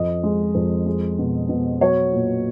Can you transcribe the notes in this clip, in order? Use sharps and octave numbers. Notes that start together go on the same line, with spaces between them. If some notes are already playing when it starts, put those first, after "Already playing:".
Already playing: F2 D#5
G#3
F2
G#3
B2
B2
F#3 C#5
A#2